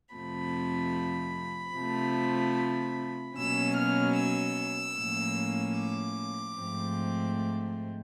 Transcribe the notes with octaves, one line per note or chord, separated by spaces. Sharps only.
F2 C3 F3 A3 B5
C3 F3 A3
B2 F#3 A#3 C#4 E6
F6
E6
A2 F3 A#3 C#4
D6
G#2 F3 A3 C4